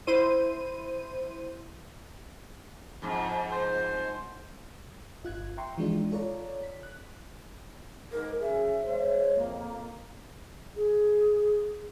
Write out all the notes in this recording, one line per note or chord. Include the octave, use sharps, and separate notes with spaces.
E4 C5 D#7
F2 G#2
C5
G1 F4 F#6 G#6
E5 G5 A#5 C6 C#6
E3 F3 G#3 D4 D#4 F4
F4 A4 C#5 D5 A#5
B6
F#6
G#2 A#4
F#2 C#3 G#4 E5
G#3 C5 C#5
F2 A#3
G#4